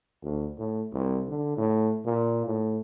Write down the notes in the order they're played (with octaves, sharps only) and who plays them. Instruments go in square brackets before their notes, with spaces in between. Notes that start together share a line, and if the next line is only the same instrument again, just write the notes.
[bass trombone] D2
A2
C2
D3
A2
A#2
A2